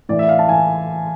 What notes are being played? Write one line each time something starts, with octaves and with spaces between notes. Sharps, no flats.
A2 E3 D5
E5
F5
A5
E3 G#5